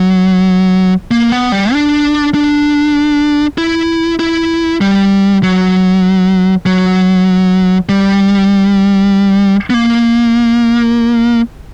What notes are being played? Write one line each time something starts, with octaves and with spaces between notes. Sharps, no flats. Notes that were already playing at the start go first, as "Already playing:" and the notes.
Already playing: F#3
A#3
B3
G3
D4
D4
E4
E4
G3
F#3
F#3
G3
B3
A#3